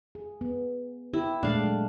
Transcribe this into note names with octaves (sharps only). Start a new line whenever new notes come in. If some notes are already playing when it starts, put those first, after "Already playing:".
G#4
B3
E4 G4
A#2 G#3 A3 D4 F5
F#3